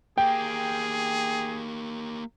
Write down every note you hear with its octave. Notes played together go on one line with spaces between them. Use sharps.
A#3 G4 G#4 G5